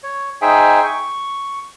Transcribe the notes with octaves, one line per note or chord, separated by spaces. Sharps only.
C#5
D#4 G#4 C5 E5 G5 G#5
C#6